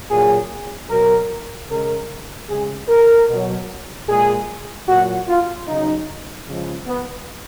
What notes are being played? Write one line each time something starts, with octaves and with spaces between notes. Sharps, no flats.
A#2 F#3 G#4
B2 F#3 A#4
C#3 G#3 A#4
C#3 G#3 G#4
A#4
B2 F#3
A#2 G#3 G#4
A#2 F#3 F#4
F4
C#3 F#3 D#4
C#3 F3 G#3
B3